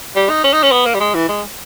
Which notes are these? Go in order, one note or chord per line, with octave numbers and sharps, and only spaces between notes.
G3
D#4
C#4
D#4
C#4
B3
A#3
G3
G#3
E3
G#3